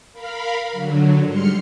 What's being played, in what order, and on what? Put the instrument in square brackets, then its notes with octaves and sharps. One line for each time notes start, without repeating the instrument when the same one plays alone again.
[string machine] A#4 F5 B5
D3 F#3
G#2 G3 C6 F6 C#7